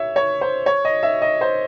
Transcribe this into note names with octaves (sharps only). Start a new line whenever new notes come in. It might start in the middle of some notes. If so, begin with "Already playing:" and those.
Already playing: C#5 E5
C#5
C5
C#5
D#5
E5
D#5
C5